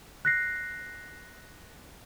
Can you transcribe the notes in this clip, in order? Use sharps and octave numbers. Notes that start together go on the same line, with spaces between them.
F#6 A#6 C7